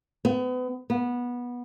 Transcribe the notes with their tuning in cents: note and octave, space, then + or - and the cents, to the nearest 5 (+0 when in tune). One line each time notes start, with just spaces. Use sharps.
B3 +35
B3 -15